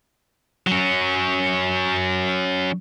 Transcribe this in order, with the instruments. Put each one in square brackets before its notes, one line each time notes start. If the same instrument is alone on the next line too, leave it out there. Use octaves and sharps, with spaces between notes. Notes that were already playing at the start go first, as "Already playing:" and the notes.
[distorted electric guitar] F#3 C#4